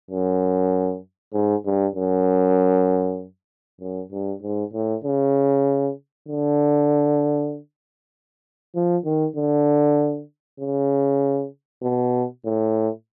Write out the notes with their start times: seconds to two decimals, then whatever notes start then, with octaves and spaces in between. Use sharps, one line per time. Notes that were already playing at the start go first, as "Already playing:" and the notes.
0.10 F#2
1.34 G#2
1.65 G2
1.95 F#2
3.80 F#2
4.11 G2
4.42 G#2
4.73 A2
5.04 C#3
6.28 D3
8.75 F3
9.05 D#3
9.36 D3
10.60 C#3
11.83 B2
12.45 A2